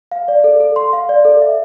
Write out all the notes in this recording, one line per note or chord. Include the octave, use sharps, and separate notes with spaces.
F5
D5
A4
A4
C6
F5
D5
A4
E5